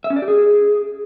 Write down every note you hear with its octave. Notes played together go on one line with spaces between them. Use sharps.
E5
C#4
D5
G4
G#4